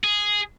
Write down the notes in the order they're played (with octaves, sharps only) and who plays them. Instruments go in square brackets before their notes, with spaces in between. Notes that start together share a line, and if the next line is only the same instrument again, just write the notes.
[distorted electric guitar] G#4